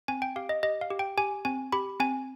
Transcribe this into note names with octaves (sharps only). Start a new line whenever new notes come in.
C4 G#5
G5
G4 F5
D#5
G4 D#5
F5
G4
G5
G4 G#5
C4 G#5
G4 B5
C4 G#5